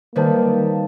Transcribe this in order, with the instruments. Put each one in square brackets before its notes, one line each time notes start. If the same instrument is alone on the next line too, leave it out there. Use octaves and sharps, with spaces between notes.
[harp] D#3 G3 [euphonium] A#3 [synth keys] B4 C5 A5